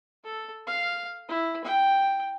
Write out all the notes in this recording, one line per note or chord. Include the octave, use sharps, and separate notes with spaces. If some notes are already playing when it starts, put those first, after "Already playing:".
A4
F5
E4
G5